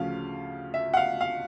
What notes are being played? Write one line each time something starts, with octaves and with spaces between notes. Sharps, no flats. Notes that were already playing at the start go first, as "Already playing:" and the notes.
Already playing: D2 C#3 F3 F5
E5
F#5
F5
F5